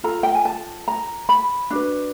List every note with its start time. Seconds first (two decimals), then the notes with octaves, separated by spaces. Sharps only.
0.04 F4 A4 A#5
0.23 G5
0.35 G#5
0.45 A5
0.88 A#5
1.29 B5
1.71 D4 F#4 B4